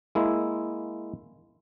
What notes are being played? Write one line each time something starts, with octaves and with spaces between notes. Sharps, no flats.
G#3 A#3 E4